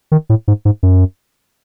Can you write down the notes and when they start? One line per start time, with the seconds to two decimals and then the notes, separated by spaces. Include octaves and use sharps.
0.12 D#3
0.29 A2
0.48 G#2
0.65 G#2
0.83 F#2